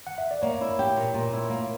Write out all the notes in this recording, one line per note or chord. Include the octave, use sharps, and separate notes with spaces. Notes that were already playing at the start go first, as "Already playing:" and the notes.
F#5
E5
D5
A#3 C#5
E4
G4
A#2
A#2
E4
A#3